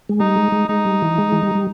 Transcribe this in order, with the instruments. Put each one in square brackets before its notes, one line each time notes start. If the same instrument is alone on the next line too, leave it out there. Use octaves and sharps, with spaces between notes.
[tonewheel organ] G#3
[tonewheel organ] G3 [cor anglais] D#4
[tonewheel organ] G#3
G#3
[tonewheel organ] G#3 [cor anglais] D#4
[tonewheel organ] G3
E3
G#3
E3
G3
G3